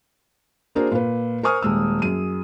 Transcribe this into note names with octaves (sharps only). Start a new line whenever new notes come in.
A#3 D4 F#4 G#4 A#4 C5
A#2 F4 B4
A#4 C5 G#5 C#6 D#6 F6
D#1 G#3 E6
F#2 G#4 D#7